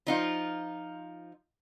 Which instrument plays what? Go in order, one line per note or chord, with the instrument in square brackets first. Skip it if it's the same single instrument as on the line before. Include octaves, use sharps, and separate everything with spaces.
[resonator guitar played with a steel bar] F3 D#4 F4